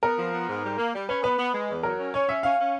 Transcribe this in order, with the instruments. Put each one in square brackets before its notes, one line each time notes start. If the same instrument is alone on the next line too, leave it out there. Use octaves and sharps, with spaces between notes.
[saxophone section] B3 [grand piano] A#4
[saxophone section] F3
B3
G#2
G3
A#3
G3
[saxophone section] C#4 [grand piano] B4
[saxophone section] B3 [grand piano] B4
[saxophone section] B3
G#3
E2
[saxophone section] F#3 [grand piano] A#4
[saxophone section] C#4
[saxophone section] C#4 [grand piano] C#5
[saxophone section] C#4 [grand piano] E5
[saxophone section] C#4 [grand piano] F5
[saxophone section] C#4